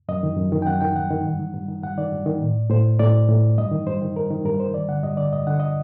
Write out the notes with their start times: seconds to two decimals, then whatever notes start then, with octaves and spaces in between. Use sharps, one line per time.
0.09 F#2 D#5
0.23 D#3
0.37 F#2
0.52 D#3
0.62 G5
0.67 F#2 F#5
0.81 D#3 G5
0.96 F#2 F#5
1.10 D#3
1.25 G2
1.40 D#3
1.54 G2
1.68 D#3
1.83 G2 F#5
1.98 D#3 D5
2.12 G2
2.26 D#3
2.41 A2
2.70 A2 C5
2.99 A2 D5
3.29 A2
3.58 G2 D#5
3.72 D#3
3.87 G2 C5
4.01 D#3
4.16 G2 A#4
4.31 D#3
4.45 G2 A#4
4.60 D#3 C5
4.74 G2 D5
4.89 D3 F#5
5.03 G2 D#5
5.17 D3 D5
5.32 G2 D#5
5.47 D3 F#5
5.60 D#5